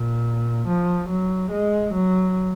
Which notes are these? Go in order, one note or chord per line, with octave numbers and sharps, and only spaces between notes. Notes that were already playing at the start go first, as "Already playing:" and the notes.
Already playing: A#2
F3
F#3
G#3
F#3